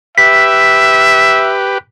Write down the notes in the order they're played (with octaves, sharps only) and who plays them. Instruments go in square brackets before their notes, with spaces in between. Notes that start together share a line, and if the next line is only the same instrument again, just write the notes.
[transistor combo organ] G4 B4 [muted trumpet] E5 [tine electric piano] B6